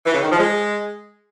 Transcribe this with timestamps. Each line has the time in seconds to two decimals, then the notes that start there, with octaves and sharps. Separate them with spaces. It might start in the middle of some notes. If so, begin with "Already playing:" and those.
0.05 E3
0.14 C#3
0.22 D#3
0.31 F3
0.39 G#3